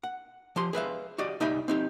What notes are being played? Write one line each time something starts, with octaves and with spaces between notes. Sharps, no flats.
F#5
F3 G4 C6
G#4 B4 E5 F5
F#4 G4 D5 D#5
C2 D#4 G4 E5 G#5 B5
C4 D#4 G4